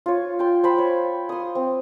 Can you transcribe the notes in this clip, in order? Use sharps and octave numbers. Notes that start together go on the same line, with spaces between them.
F4 C#5
G5 C6
C5 G5 B5
C#5
C6 D#6
C4